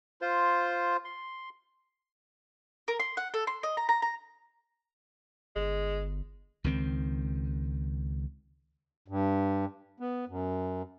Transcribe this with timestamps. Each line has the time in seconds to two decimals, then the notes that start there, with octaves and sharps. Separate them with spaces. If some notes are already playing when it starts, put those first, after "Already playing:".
0.21 F4 C5
1.05 C6
2.88 A#4
3.00 C6
3.17 F#5
3.34 A4
3.47 C6
3.63 D#5
3.77 A#5
3.89 A#5
4.02 A#5
5.56 G1 G#3
6.64 C#2 D#3 C4
9.08 G2
10.00 B3
10.29 F#2